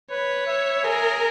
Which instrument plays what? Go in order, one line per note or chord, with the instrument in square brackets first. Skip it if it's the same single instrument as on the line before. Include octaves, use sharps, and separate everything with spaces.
[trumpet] B4 [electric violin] C#5
[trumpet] E5
[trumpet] G#4 [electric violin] A#4